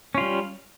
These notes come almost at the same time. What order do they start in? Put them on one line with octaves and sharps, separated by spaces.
C#4 F4 G3